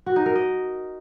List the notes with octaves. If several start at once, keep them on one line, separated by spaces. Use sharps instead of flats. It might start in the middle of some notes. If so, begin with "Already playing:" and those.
F#4
D#4
A#4
D#5